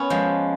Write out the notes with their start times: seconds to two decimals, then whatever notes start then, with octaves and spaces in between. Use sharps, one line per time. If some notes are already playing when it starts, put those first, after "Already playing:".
Already playing: B3 C#4
0.10 F3 G#3